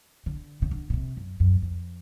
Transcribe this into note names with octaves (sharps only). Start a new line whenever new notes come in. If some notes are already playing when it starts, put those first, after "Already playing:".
D3
C#3
D3
C#3
C3
F#2
F#2
F2